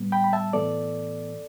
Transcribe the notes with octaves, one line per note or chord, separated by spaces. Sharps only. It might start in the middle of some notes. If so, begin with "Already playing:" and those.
Already playing: A2 G3 B3
G5 B5
B5
E5 A5
A2 E3 B3 A4 D5